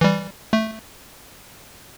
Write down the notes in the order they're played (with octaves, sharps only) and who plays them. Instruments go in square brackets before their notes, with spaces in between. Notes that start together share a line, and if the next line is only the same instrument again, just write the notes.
[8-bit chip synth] E3 G3
A3